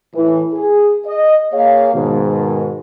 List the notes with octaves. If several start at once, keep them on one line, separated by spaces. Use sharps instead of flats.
A2 E3
G#4
D#5
A#3 G#4 C#5 F5
G#2 B2 D#3